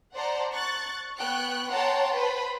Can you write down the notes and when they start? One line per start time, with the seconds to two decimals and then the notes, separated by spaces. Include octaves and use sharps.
0.15 C5 D5 F#5 A5 A#5
0.52 C#6 F#6 A6
1.18 B3 G5 C#6 F#6
1.72 C#5 F#5 G5 A5 A#5 C6
2.16 B4 C5 B5